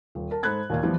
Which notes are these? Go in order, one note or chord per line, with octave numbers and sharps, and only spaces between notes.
D#1
A#4 A5
G#2 A4 C5 B5 F#6 G#6
D#2 A#2 F5
E3 F3 G3 B3